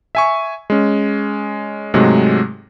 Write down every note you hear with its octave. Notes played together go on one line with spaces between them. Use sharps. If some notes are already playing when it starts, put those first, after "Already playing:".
E5 G#5 C#6
G#3 C#4
G#2 C3 F#3 G#3 A3